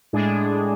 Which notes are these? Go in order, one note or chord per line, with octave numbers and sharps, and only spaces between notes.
A2 G#3 D4 G#4